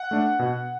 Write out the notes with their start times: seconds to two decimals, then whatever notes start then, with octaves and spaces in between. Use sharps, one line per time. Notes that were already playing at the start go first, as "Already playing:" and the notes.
Already playing: F#5
0.11 A3 D4
0.39 B2